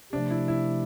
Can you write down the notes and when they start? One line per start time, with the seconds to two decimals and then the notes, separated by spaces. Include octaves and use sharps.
0.13 C3 F3 A3 D4
0.30 E4
0.48 E4